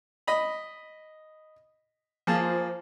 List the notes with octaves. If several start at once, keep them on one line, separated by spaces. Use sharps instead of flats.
D#5 B5
F3 A#3 G#4 A5